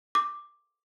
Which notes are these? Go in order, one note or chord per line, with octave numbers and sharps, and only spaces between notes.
D6